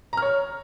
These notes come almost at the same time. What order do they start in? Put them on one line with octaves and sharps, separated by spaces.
A#5 F6 C#5